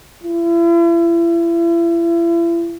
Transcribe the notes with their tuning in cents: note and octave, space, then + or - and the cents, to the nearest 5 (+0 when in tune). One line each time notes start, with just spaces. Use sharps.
E4 +40